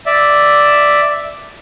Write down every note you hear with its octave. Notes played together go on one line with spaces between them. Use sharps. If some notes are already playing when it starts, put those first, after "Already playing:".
D5 E5